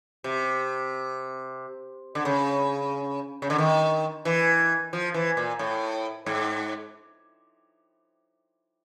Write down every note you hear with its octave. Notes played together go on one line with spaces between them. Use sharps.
C3
D3
C#3
C#3
D3
D#3
E3
F3
E3
A#2
A2
G#2